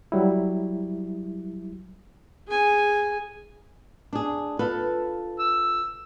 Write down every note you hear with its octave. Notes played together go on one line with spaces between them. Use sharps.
F#3 G3 E4
G#4 G#5
D4 G#4
F4 A4 B4
E6